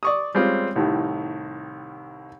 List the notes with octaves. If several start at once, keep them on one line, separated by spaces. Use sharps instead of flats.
D5 C#6 D#6
G3 G#3 C4 C#4 F4
C2 A2 D#3